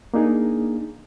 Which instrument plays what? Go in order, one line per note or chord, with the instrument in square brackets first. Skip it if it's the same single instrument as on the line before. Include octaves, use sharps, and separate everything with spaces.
[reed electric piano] A#3 D4 D#4 G#4